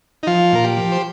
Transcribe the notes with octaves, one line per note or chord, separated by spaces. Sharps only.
D#4
F3 F4
A#2 A#4
G4
F3
C5